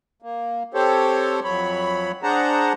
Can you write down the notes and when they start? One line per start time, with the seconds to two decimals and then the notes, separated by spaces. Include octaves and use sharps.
0.22 A#3
0.74 C4 G4 A4 C5 C#5
1.44 F2 F#3 C#5 B5
2.23 D4 G#4 C5 F#5 A5 A#5